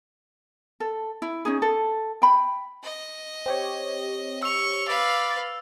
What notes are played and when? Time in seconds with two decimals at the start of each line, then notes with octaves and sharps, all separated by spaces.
0.80 A4
1.22 E4
1.45 C#4 D#4 G#4
1.62 A4
2.22 G5 B5
2.84 D#5
3.46 C4 G4 C#5
4.43 C#6 E6 F7
4.88 B4 D5 F5